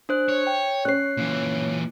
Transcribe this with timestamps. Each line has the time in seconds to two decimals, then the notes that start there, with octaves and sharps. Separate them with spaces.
0.09 D4 C5 F#6
0.29 C#5
0.47 G5
0.85 C#4 C#5 F#6 C7
1.17 A#2 E3